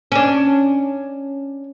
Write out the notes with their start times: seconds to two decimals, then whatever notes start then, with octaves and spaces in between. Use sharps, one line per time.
0.12 C#4 D4